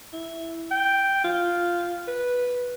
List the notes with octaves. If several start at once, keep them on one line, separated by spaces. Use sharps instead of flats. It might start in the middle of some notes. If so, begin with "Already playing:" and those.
E4
G5
F4
B4